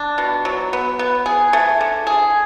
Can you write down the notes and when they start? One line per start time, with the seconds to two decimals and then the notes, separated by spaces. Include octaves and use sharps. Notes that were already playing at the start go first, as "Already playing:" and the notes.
Already playing: D4
0.18 B2
0.45 F#3
0.73 B3
0.99 B3
1.26 G#4
1.53 A3
1.81 D3
2.07 G#4